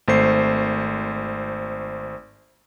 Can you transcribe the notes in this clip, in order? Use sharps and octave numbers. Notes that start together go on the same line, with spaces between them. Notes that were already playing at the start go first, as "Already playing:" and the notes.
G#1 A3 C5 C7